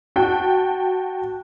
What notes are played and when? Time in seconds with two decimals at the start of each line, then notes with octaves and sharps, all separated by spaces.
0.16 F#4 G5 A5